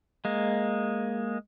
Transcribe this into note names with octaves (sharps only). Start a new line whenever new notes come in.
G#3 A#3